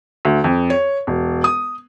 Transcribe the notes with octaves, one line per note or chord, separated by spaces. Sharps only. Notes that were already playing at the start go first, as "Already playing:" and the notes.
D2
F2
C#5
E1
D#6